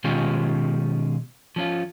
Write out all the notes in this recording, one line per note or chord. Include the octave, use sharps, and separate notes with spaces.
B2 D#3 G#3 C#4 F4 G4
F3 C#4 F4